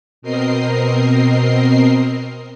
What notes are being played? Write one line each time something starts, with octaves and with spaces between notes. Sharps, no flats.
B2 C4 A#4 D#5 C7